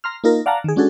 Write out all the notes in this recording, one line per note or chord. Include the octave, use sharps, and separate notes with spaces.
A#5 C6 F6
A#3 D#4 F4 A#4
D5 F5 F#5 A5 A#5
D#3 G#4
G#3 C#4 D4 F#4 G#4 A4